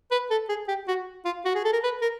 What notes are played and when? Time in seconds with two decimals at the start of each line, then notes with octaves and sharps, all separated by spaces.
0.11 B4
0.30 A4
0.49 G#4
0.68 G4
0.88 F#4
1.25 F4
1.45 F#4
1.55 G#4
1.64 A4
1.73 A#4
1.83 B4
2.01 A#4